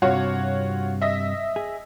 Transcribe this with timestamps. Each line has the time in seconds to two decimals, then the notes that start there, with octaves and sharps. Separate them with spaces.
0.02 G2 C3 F4 F#4 C#5
1.02 D#5 E5
1.56 G#4